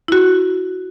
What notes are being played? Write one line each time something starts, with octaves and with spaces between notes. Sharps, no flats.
E4 F#4